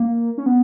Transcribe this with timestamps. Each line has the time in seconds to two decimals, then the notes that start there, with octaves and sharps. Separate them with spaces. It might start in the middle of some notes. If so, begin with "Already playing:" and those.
Already playing: A#3
0.38 C#4
0.46 B3